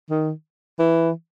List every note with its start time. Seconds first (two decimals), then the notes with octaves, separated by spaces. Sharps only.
0.10 D#3
0.79 E3